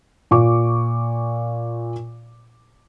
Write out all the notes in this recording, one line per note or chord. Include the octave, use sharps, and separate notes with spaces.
A#2 F4 C#6 D6